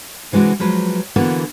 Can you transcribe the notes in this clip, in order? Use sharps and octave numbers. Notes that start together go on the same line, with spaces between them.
C3 E3 G#3 D4 F#4
F3 F#3 G#3 B4
D3 E3 A#3 B3 F#4